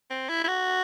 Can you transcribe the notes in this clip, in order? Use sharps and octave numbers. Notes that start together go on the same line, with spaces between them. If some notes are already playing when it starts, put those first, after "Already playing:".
C4
E4
E4
F#4